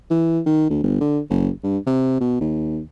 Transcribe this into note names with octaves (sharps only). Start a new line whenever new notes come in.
E3
D#3
D2
G1
D3
F#1
G2
C3
B2
D#2